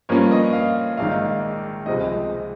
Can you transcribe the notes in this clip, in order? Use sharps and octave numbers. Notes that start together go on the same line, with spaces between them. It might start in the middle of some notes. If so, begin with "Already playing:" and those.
G2 F3 A#3 C#4 C#5
D#5
F5
A#1 G#2 D#3 F5
C#2 C3 F3 G#3 D#5